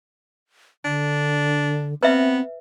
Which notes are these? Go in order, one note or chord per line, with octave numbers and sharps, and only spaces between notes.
D3 D4
B3 C4 B4 E5